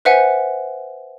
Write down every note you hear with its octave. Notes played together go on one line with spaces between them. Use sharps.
B4 C5 E5 F#5 G#5